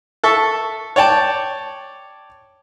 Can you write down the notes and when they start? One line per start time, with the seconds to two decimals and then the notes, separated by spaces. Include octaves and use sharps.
0.24 A4 E5 C#6
0.96 C#5 D5 G5 A5